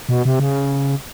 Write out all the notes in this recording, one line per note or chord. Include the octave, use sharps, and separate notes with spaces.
B2
C3
C#3